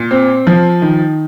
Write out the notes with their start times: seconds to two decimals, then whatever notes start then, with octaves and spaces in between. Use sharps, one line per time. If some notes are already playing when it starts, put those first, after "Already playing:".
Already playing: A#2
0.11 C4
0.47 F3
0.82 D#3